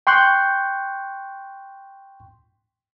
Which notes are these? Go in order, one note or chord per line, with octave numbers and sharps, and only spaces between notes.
G5 C6 C#6 F#6 G6